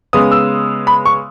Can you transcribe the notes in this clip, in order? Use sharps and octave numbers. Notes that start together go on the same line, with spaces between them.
C#3 G#3 B3 D#6
E6
B5
C#6